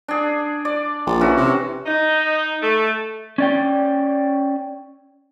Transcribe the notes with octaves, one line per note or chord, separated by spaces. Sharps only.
D4 G#4
D5
A#1
E3 C#4 F#4
C3
D#4
A3
C#4 D5 G5